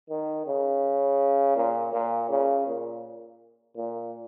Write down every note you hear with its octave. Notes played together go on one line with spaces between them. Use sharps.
D#3
C#3
A#2
A#2
C#3
A#2
A#2